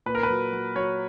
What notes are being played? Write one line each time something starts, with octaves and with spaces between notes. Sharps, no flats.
A#2 B4
A#4
B4
F#3
F#3
F#3 C#5